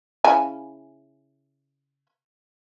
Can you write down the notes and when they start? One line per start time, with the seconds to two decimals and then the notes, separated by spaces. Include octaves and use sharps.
0.24 C#3 E4 G#5